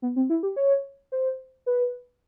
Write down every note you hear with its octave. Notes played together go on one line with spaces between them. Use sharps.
B3
C4
E4
G4
C#5
C5
B4